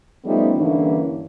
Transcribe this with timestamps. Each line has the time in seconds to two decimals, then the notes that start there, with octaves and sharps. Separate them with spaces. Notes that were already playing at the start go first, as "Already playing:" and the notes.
0.24 F3 G3 A3 B3 C#4 D#4
0.56 G2 D3 E3 A#3 C#4 E4